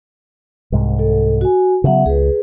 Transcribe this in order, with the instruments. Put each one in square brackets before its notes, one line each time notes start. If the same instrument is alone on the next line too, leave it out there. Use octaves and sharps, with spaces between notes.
[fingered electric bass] C2 G#2
[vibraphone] A4
F#4 G#5
[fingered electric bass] C#3 F#3 [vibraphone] B3 E5 F#5
[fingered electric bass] C#2 [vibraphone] G#4 B4